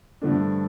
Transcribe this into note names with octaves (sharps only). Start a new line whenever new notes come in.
G2 D3 F3 A3 D4